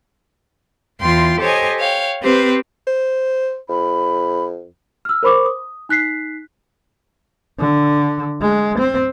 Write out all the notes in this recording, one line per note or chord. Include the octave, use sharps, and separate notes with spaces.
E2 E3 F4 G5 C6
G4 A4 C5 C#5 D#5 G#5
C#5 F5 G5
C4 G4 B4 C5
C5
F2 B5
E6 F6
A#4 C5 B5 C#6 D6
D#6
D#4 F#6 B6 C7
D3
G#3
C4